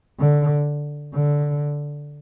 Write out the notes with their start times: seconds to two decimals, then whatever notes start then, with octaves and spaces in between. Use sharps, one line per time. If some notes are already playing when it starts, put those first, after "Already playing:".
0.20 D3
1.14 D3